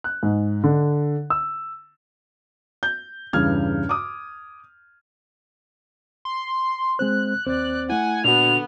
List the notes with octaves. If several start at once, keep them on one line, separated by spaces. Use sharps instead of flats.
F#6
G#2
D3
E6
G6
E2 G2 C#3 F6 G#6
D6 D#6
C6
G#3 C4 C5 F#6
D#2 C4 C5 D5
A3 E4 F#5 G#5
A#2 D3 B3 F#4 F7